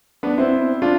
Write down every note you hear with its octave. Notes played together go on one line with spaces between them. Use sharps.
B3 D4
C4 E4
D4 F4